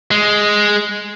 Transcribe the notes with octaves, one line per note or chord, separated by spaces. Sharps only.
G#3